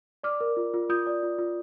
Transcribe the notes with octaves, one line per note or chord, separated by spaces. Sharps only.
D5 D6 F6
A#4
F4
F4
F4 D#6 G6
D5
F4
F4